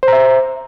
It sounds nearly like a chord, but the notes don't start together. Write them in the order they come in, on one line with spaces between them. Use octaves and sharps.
C5 A#5 E5